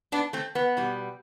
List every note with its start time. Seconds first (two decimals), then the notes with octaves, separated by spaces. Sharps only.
0.12 B3 D4
0.33 A3 C4
0.55 B3
0.77 B2 G3